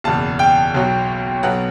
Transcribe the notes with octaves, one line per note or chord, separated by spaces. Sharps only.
F#1 E2 B2 A5
G5
B1 B2 F#3
B1 B2 F#3 B3 F#5